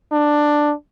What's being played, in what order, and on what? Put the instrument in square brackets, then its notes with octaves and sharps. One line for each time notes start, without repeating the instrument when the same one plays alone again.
[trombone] D4